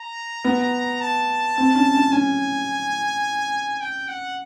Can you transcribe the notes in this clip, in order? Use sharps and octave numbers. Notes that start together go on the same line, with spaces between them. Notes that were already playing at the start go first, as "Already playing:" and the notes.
Already playing: A#5
B3
A5
C4
C#4
C#4
C#4 G#5
G5
F#5